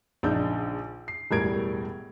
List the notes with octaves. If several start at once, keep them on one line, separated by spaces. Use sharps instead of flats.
A#1 C#3 D4 D#4 E6 G6
C7
E1 A2 G3 A#4 G#6 D7